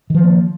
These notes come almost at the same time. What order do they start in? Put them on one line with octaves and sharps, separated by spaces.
D#3 F3 C4 A#3